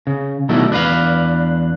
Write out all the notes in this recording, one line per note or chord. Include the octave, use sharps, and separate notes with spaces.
C#3
B2 D#3 F#3 G3 A3 E4
E2 D4 F4 B4 F5